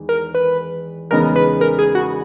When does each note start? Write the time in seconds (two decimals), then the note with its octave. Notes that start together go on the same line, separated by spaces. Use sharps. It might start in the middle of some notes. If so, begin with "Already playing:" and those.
Already playing: E2 D#3 G#3
0.09 A#4
0.34 B4
1.11 E2 C#3 G#3 B3 D#4 A#4
1.36 B4
1.61 A#4
1.79 G#4
1.95 F#4